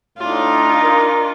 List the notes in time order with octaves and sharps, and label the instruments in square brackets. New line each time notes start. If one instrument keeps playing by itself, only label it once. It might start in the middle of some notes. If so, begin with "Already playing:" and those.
[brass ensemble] A2 [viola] D4 F4 [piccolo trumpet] D#4
[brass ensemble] A#4